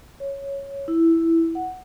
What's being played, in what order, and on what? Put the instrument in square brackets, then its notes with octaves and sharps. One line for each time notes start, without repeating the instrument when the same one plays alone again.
[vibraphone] C#5
E4
F#5